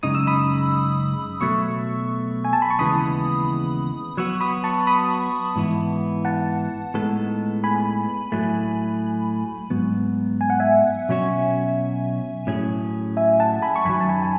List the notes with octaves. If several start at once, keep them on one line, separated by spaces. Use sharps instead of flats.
F#2 C#3 G#3 D#4 D#6
E6
B5 D#6
B2 F#3 A3 C#6 E6
G#5
A5
B5
C#6
D#2 C#3 E3 G#3 B3 B5 D#6
F#3 B3 F#4 C#6 E6
B5 D#6
A5 C#6
B5 D#6
G#2 E3 B3 E4
F#5 A5
A2 G#3 B3 D#4 A4
G#5 B5
A2 F#3 A3
G#2 F#3 B3
G#5
F#5
E5 G#5
B2 F#3 C#4 F#4 C#5
A2 F#3 C#4 G#4
E5 G#5
F#5 A5
G#5 B5
C#6
F#2 D#3 F#3 G#5 B5
A5
G#5 B5
G#5